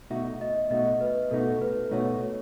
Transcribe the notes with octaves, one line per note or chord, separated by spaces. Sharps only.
B2 A3 D#4 F#4 E5
D#5
B2 A3 D#4 F#4 D#5
B4
B2 A3 D#4 F#4 A4
B4
B2 A3 D#4 F#4 C#5
C#5